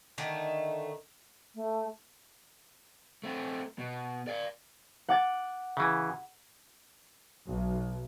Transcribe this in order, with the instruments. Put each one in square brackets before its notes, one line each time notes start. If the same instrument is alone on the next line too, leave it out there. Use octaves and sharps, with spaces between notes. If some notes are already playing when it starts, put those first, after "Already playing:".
[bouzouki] D3 D#3 A3 D#4
[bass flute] A3
[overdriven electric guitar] A3 C4
B2
D5 F5
[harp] F#5 D6 A6
[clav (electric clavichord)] C#3 E3
[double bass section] B1